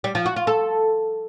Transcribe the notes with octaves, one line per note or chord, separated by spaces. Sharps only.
G3
F3
F#4
F4
A4